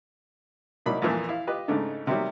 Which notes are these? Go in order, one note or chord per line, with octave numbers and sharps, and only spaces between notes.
C2 F#3 A#3 D#4 D5 B5
F2 A#2 E3 F3
E4 F5
F4 G4 B4 D#5
G#2 C#3 A3 D4 D#4
C3 D#3 F#3 G3